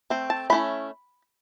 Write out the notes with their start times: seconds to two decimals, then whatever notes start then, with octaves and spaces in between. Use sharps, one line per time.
0.10 A3 C4
0.30 A5
0.50 E3 A3 C#4 E4 B5